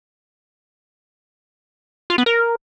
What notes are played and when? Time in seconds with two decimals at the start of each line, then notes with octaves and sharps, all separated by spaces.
2.10 F4
2.18 B3
2.26 A#4